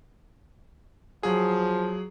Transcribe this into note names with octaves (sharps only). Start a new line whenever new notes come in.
F3 F#3 G#4